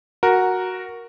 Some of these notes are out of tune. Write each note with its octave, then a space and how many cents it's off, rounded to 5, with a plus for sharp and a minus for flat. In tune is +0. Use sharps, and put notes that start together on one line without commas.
F#4 +0 A#4 +0